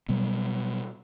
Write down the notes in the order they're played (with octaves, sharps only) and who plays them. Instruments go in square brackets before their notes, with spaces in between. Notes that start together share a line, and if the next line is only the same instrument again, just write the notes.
[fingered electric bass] B2 F#3 G3 B3